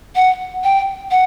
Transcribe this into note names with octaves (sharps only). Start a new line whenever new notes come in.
F#5
G5
F#5